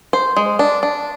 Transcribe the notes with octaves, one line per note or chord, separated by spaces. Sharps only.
C5
G#3
D4
D4